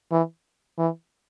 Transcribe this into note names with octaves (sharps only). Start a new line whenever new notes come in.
E3
E3